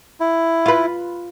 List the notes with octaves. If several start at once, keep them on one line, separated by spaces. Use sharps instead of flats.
E4
F4 B4